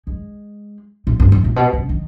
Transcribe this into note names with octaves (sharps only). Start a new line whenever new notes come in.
G#3
A#2
G2
G#2
A#2
B2
C#3
D#3